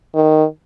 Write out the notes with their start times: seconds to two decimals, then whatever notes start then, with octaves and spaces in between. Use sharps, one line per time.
0.15 D#3